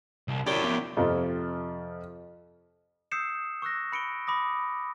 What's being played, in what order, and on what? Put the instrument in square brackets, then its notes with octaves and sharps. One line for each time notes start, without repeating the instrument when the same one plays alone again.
[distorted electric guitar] C2
[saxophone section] F#2 G4 [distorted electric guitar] E4 D5
[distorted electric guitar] F3 B3
[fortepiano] F2 C3 F3
[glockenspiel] D#6 E6 G6 C7 C#7 E7
C#6 E6 F#6 A#6
B5 C#7 D7 G7
B5 D6 D#6 A#6